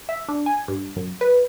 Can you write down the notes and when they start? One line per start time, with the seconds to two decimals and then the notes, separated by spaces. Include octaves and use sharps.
0.09 E5
0.29 D4
0.46 G#5
0.68 G2
0.96 F#2
1.21 B4